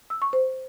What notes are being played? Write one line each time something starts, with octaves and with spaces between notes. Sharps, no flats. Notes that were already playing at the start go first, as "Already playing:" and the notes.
E6
C#6
C5